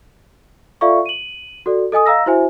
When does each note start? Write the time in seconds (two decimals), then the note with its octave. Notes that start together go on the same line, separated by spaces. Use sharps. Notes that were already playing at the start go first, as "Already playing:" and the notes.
0.81 F4 A4 D5 E5 F5 C#6
1.06 D#7 F#7
1.66 F#4 A4 D5
1.92 A4 D#5 G#5 D#6
2.06 D#5 F5 A#5 E6 A#6
2.26 E4 F#4 C5 E5 G#5